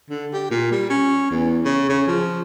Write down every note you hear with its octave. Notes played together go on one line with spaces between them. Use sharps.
D3
G4
A#2
G3
C#4
E2
C#3
C#3
F3